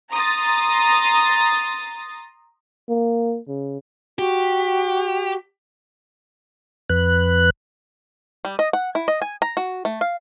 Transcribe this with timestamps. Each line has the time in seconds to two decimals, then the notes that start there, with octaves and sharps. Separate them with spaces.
0.12 A#5 C6 D#6 A6
2.89 A#3
3.48 C#3
4.19 F#4 G4
6.89 F2 B4 F#6
8.45 G3
8.59 D#5
8.73 F#5
8.95 E4
9.08 D#5
9.22 G#5
9.42 A#5
9.57 F#4
9.85 A3
10.01 F5